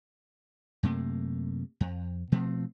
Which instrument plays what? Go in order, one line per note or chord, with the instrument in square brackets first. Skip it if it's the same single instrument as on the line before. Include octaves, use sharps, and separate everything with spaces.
[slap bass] F#2 C3 A3 A#3
F2
B2 F3 A3 C4